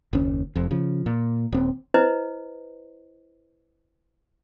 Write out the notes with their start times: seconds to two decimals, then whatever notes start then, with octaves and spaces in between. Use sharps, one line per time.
0.13 F#1 D#2 C#4
0.56 F1 F2
0.71 C#3 F3
1.06 A#2
1.52 D#1 C4
1.94 E4 B4 C5 D#5